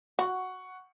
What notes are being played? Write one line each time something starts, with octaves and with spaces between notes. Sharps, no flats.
F#4 F#5 C#6